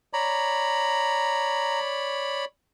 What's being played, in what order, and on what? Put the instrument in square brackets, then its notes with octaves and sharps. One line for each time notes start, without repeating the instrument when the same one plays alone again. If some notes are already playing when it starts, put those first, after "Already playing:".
[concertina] C#5 D5 B5 [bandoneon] A#5